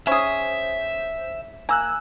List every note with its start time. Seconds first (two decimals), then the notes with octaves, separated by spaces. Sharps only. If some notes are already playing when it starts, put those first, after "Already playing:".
0.07 C#4 G#4 C5 E5
1.69 A#3 G#5 E6 F#6